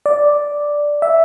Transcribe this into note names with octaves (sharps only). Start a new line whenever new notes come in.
D5
E5